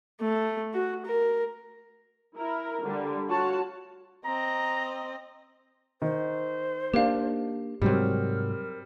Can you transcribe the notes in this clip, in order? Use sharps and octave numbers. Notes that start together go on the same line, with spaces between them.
A3
F#4
A#4
E4 A#4
D3 G3
F4 F#4 C#5 A5
C4 D#5 A#5
D#3 C5
A#3 D4 G4 F5
G#2 C3 F#3 G3 C4 A#4